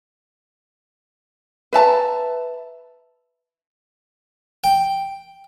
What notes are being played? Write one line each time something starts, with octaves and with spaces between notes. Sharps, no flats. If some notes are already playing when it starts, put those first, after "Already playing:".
B4 E5 A5 A#5
G5